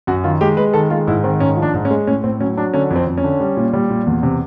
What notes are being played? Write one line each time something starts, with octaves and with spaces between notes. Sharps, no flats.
F#2 F#4
D#3 F4
G#3 G4
G#3 B4
D#3 A4
G#3 F4
G#2 E4
D#3 C4
G#2 C#4
F3
D4
G#2
C#4
G#3
A2 C#4
A2 C4
F#3 C#4
F#3 D4
D3 C#4
F2
C4
F2
C#4
D3
G3
A#2
G3
A#2
E2
C3